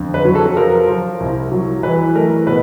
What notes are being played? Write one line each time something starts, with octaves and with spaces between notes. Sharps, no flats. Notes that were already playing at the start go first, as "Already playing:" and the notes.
Already playing: F2 D3
B4
F#3
A4
F3 A#4
F3
C2
F#3
E3 B4
A3 A#4
B2 B4